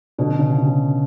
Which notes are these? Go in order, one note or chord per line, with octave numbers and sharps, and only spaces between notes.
B2 D3
C#3
C#3